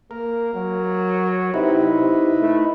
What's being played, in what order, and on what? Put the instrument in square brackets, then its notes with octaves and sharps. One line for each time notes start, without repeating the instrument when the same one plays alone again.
[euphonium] A#3 [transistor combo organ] A#4
[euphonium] F#3
[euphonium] C3 [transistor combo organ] D#4 E4 B4
[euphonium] C3
A3